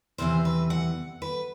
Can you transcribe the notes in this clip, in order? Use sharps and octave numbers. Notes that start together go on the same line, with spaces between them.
E2 C3 E3 C5
B4
F#5
B4